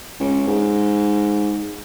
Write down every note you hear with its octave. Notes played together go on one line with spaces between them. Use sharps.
C#2
G#2